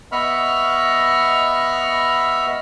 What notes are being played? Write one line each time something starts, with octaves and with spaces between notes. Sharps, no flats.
B3 D#5 E5 B5 C#6 F6